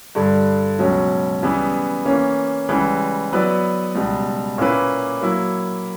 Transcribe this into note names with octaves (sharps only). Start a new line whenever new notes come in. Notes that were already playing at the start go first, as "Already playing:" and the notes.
G2 D3 G3
C#2 B2 F#3 C#4
C#3 E3 G3 B3
E3 A#3 C#4
C#2 C#3 E3 G3
F#3 B3 E4 B4 D5
C#2 B2 G3
A#2 A#3 C#4 E4 B4
F#3 A#3 E4